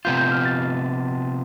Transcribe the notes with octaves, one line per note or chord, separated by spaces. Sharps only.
C3 F3 B3 F4 G6
G6
F6
A6